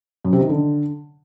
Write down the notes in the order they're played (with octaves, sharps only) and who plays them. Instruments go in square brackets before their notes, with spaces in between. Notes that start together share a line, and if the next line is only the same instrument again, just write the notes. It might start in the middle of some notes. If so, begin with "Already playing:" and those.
[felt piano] F#2
C3
D#3
D3